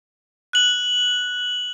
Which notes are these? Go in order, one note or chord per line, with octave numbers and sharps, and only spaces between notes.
F#6 F#7